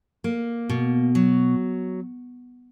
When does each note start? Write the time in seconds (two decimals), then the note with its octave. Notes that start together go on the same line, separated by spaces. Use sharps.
0.24 A#3
0.70 B2
1.15 F#3